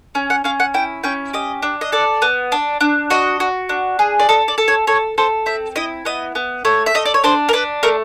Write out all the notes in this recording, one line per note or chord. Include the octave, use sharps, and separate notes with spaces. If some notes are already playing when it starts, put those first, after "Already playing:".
C#4
F#5
C#4 F5
F#5
E4 G5
C#4 G5
G4 D#5
D4
D#5
A4 D5
B3
D4
D4
F#4 D#5
F#4
D4
G#4
D5
A4 D#5
D5
A4
C#5
A4 C#5
A4 C5
C4 E5
E4 D#5
B3 D#5
B3
A3 C#5
E5
A3 D#5
D5
C#5
D4 C5
A#4
D4 B4
A3 A#4